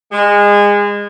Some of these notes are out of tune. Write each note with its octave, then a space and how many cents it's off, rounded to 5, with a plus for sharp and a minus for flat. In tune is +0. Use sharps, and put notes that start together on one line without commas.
G#3 -25